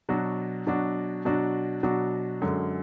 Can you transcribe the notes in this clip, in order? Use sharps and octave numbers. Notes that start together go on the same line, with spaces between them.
B2 F#3 D4 F#4
B2 F#3 D4 F#4
B2 F#3 D4 F#4
B2 F#3 D4 F#4
F#2 D3 G#3